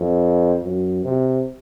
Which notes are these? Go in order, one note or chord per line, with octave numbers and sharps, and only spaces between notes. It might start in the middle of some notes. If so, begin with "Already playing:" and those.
Already playing: F2
F#2
C3